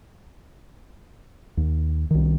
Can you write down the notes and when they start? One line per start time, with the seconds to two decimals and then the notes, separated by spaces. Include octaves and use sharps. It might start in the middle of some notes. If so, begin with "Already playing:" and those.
1.57 D#2
2.11 C2 D#3